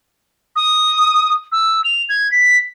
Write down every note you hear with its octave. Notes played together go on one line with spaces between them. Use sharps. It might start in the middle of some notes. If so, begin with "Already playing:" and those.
D#6
E6
F7
G#6
B6